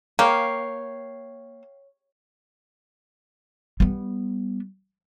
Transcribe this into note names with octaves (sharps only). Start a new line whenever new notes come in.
A#3 C#5 F5 G5
G3 B3